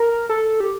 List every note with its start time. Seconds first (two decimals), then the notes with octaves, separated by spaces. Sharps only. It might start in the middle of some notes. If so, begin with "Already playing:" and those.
Already playing: A#4
0.29 A4
0.60 G4